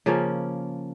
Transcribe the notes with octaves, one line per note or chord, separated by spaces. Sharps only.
C#3 F3 A#3 C#4